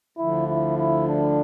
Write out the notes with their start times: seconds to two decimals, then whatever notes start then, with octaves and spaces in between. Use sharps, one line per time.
0.17 D2 D3 F3 E4
0.48 E4
0.78 E4
1.08 D4